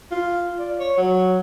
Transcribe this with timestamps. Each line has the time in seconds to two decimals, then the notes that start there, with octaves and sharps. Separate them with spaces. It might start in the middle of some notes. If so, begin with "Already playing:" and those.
0.11 F4
0.59 D5
0.79 C#5
0.97 F#3